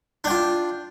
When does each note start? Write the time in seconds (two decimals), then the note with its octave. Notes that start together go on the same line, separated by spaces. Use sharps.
0.24 D4
0.27 G5
0.30 F4